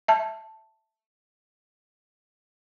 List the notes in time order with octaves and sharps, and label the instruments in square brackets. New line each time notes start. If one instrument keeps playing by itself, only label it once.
[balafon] E5 A5